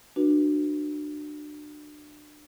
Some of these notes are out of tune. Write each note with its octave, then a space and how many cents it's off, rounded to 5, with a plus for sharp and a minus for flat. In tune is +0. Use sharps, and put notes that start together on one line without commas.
D4 +25 F#4 +0 B4 -30